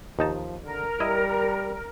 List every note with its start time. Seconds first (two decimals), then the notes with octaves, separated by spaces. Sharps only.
0.19 D#2 F3 D#4 A5
0.63 D3 A#4
1.00 G3 E4 D#5